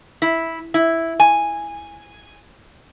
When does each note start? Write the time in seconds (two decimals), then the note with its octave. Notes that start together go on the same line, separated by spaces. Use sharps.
0.22 E4
0.74 E4
1.20 G#5